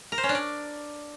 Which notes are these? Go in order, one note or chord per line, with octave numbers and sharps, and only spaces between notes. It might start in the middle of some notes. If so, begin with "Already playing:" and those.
A#4
C5
C#4
D4
D5